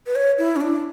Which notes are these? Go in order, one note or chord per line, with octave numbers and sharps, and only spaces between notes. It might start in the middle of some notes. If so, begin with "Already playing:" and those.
B4
C#5
E4
C#4
D4